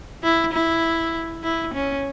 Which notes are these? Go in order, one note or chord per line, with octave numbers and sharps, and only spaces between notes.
E4
E4
E4
C#4